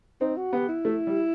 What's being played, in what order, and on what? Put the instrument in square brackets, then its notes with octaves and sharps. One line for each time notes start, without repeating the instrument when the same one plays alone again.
[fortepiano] C4 [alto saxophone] D#4
[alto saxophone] F#4
[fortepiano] B3 [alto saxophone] G4
[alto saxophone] E4
[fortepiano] A3
G3